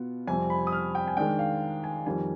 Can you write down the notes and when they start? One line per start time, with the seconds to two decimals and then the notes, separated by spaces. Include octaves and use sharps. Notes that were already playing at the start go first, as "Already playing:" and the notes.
Already playing: B2 B3 F4
0.27 F2 C3 G3 C4 G#5
0.50 B5
0.67 D#6
0.72 F6
0.95 G5
1.08 G#5
1.17 D#3 G#3 D4 G5
1.39 F5
1.84 G#5
2.06 F2 D#3 G3 G#5